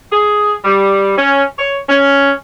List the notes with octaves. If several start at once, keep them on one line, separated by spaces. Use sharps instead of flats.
G#4
G3
C#4
C#5
C#4